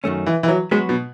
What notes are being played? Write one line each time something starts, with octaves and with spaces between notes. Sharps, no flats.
F#2 D#3 A3 C#4
E3
E3
F#3
F#3 G#3 B3 F#4 B4
B2